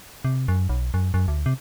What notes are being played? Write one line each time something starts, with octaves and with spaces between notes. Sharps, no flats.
C3
F#2
B1
F#2
F#2
D2
C3